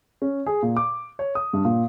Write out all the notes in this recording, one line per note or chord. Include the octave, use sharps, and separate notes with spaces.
C#4
G#4
A#2
D6
C#5
D#6
G2
A#2